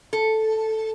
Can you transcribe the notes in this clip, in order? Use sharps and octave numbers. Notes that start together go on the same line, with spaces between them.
A4